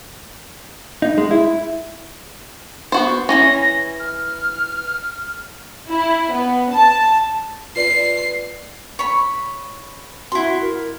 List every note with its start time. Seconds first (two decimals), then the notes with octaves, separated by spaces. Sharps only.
1.02 D#4
1.18 G#3
1.31 E4
2.92 B3 F#4 C5
3.29 E3 F#3 C#4 A#6
4.00 F6
5.89 E4
6.32 B3
6.72 A5
7.76 F4 B4 D5 C7
8.99 C#5 B5
10.32 E4 F#4 C6
10.61 A#4